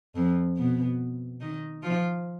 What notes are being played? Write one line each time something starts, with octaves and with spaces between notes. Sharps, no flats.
F2 F3
B2 B3
D#3 D#4
F3 F4